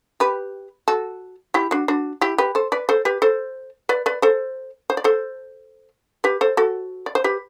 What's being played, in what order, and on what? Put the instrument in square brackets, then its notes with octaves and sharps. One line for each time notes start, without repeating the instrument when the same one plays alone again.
[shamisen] G4 B4
F#4 A4
E4 G4
D4 F#4
D4 F#4
E4 G4
G4 B4
A4 C5
B4 D5
A4 C5
G4 B4
A4 C5
B4 D5
B4 D5
A4 C5
C5
D5
A4 C5
G4 B4
A4 C5
F#4 A4
D5
C5
G4 B4